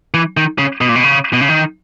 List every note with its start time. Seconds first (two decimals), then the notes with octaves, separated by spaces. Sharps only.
0.14 E3
0.37 D#3
0.58 C#3
0.81 B2
0.89 A#2
0.95 B2
1.04 C#3
1.33 B2
1.41 C#3
1.48 D#3